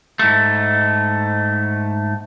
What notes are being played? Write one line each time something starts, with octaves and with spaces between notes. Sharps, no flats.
G#2 A3